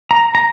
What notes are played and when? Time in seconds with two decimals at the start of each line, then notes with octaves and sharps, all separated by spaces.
0.11 A#5
0.35 A#5